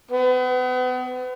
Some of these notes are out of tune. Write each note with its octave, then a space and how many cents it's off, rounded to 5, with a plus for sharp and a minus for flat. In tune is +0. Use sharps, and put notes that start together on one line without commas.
B3 +35